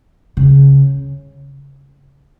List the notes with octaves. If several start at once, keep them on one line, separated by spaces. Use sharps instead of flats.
C#3